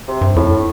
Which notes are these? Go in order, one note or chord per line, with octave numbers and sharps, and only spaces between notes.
C3
G2
F2 A2